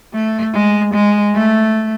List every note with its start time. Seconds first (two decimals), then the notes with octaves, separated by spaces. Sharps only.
0.13 A3
0.53 G#3
0.94 G#3
1.34 A3